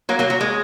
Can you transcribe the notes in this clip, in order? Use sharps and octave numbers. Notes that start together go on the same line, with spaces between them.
F#3 A#3
F#3 A#3
F#3
G#3